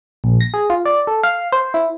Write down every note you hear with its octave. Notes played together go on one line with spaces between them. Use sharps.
A#1
A#6
G#4
F4
D5
A4
F5
C5
E4